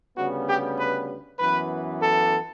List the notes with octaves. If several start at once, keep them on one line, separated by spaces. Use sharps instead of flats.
D2 C#3 G3 B3 F#4
G4
B4
F#2 E3 B3 B4
A4